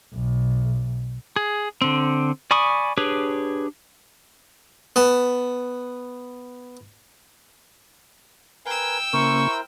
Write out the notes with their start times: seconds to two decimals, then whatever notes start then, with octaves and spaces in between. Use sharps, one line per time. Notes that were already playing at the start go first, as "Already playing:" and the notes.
0.14 B1
1.36 G#4
1.82 D3 C4
2.51 D5 G#5 B5 C#6 D#6
2.98 D4 G4 G#4 B4 C#5
4.96 B3 A5
8.66 A#4 B4 G5 G#5 E6
9.13 C#3 A#3 E4 A#4 C5 C#6